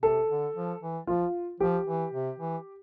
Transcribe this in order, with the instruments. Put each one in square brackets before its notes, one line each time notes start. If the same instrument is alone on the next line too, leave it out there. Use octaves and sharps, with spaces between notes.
[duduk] C3 [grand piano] A4
[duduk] D3
F3
E3
[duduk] F3 [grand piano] F4
[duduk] F3 [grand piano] G4
[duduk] E3
C3
E3